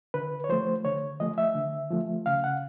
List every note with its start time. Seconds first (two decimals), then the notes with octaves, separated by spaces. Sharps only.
0.14 D3 B4
0.44 C#5
0.49 F3 A3 C5
0.85 D3 C#5
1.20 F3 A3 D#5
1.38 E5
1.55 D3
1.90 F3 A3
2.26 C#3 F5
2.44 F#5